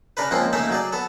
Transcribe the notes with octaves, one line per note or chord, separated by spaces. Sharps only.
C#3 D4 A#4 B4
F3 G#3 A#3 C4 C#4
C#3 A3 A#3 D#4 E5
F#3 G#4 D5
B3 A4